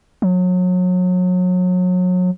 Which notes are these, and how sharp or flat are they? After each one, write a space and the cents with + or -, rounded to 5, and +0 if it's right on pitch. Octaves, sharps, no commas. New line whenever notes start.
F#3 -30